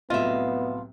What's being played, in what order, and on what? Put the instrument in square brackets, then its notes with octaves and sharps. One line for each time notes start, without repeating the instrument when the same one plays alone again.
[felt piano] C2 A2 F#3 [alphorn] B3 [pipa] F4 [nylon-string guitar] D#5 E5